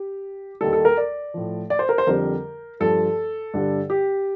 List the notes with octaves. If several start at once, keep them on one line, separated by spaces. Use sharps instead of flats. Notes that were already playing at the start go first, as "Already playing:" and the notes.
Already playing: G4
D#2 D#3 G3 A4
A4
A#4
D5
A2 F3
D5
C5
A#4
C5
F2 D3 G3 A#4
G2 F3 A4
G2 D3 G3
G4